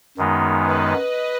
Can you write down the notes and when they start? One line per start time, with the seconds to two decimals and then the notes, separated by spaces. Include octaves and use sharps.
0.18 F#2 D#3 G#3 B3 D#4
0.65 B4 D#5